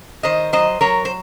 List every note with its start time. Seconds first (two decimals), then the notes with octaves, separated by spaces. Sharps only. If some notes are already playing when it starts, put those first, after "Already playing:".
0.23 D#3 C5 D#5
0.53 F#3 C5 D#5
0.81 F#3 A#4 C#5
1.05 C5